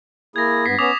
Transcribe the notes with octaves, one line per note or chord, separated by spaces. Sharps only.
A#3 E4 G#4 G#6 A#6
G2 B3 B6 C7
B3 C#4 D6 D#6 F7